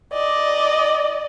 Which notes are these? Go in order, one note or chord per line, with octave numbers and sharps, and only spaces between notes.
D5 D#5